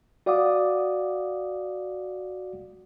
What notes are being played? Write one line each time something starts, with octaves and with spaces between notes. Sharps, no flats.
F#4 D5 F5 F#5 D6 D#6